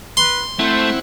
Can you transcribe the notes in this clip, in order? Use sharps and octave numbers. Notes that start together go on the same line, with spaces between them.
B4 C6
A3 C4 E4 C5 F#5